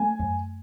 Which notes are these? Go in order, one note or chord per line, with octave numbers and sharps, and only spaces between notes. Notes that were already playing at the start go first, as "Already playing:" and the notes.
Already playing: A3 G#5
F#2